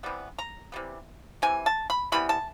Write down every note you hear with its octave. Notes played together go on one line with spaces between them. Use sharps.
C3 E3 G3 B3
A#5
C3 E3 G3 B3
C3 E3 G#5
A5
B5
C3 E3 G3 B3 B5
A5